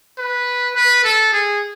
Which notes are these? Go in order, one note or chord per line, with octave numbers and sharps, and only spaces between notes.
B4
B4
A4
G#4